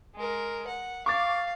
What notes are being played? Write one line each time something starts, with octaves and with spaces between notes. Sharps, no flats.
G#3 A#4
F#5
F5 C#6 D6 A6